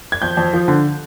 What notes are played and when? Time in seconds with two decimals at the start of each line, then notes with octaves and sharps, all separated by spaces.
0.12 G#6
0.22 F2 G6
0.37 F2
0.53 F3
0.68 D3